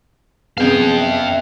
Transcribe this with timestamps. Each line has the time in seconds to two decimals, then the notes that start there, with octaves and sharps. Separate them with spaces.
0.58 F#2 C3 B3 G#4 F5 G5
1.00 E5